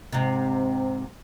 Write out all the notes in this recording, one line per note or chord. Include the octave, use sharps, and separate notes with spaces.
G#2 C3